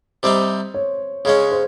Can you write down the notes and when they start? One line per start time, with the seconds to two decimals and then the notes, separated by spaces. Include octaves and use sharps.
0.23 C3 G3 C4 D#4 C5
0.74 C#5
1.25 C#3 G#3 C#4 C#5
1.51 C5